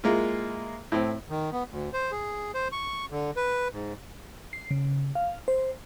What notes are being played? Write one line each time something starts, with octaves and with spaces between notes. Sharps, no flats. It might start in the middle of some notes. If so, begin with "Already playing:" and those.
G#3 A#3 E4 F4
A2 C4
D#3
B3
D2
C5
G#4
C5
C#6
D3
B4
G#2
C7
C#3
F5
C5